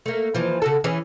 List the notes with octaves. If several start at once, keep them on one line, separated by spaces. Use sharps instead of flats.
A3 A#3
D#2 E3 F3
C#3 F#4 A4
E3 C#4 G#4